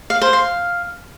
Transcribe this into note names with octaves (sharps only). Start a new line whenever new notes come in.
F5
C5
F5